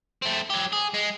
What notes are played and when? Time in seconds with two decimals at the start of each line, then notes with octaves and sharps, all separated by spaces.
0.22 A3 C4
0.50 F#3 G4
0.72 G#4
0.94 G#3